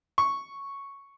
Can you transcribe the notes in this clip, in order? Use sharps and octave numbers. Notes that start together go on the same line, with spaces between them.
C#6